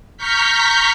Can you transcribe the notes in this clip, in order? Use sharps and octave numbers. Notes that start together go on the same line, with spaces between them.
A#5 C#6 F6 G6 B6